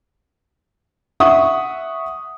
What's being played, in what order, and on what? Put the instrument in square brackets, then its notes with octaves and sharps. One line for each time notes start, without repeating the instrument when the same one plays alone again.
[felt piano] E5 F#5 C#6 D#6